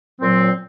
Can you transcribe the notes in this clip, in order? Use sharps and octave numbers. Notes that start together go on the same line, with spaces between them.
A#2 F#3 C4